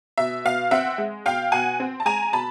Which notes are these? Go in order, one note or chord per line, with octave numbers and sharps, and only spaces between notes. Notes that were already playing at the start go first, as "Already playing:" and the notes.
B2 E5
B2 F5
C4 E5 F#5
G#3
B2 F5 G5
B2 F#5 G#5
C4
A5
G#3 G#5 A#5
B2 A5 B5